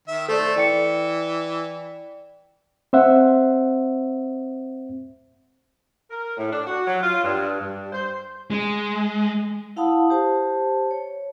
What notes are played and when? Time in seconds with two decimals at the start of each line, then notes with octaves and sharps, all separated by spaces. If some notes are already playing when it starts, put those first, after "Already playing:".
0.08 D#3 E5
0.28 A3 A4 C5 D5
0.56 E3 D5 G5 C#7
2.93 C4 C5 E5 F#5
6.10 A#4
6.37 A2
6.51 D4
6.66 F#4
6.87 F#3
7.03 F4
7.23 G2
7.59 G2
7.92 C5
8.51 G#3
9.76 E4 F5 F#5 A5 B5 D#6
10.10 G4 C5 A5
10.91 C#5